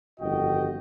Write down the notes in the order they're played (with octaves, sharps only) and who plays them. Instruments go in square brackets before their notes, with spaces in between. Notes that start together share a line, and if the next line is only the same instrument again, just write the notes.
[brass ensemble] G1 F2 D#3 F#4 D#5 G5